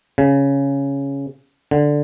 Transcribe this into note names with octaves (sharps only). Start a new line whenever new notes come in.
C#3
D3